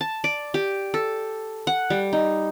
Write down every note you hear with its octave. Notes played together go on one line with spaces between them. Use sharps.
A5
D5
G4
A4
F#5
G3
D#4